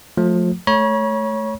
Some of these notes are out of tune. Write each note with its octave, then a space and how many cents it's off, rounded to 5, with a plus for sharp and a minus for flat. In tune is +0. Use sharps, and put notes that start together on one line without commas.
F3 +30 A3 +0
A3 -20 C#5 +0 B5 -45